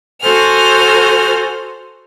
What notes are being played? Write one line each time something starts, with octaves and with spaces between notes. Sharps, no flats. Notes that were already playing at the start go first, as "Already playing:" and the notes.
F#4 A4 C5 G#5 F6